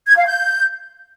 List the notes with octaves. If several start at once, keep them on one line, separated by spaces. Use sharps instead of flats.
G#6
F5
G6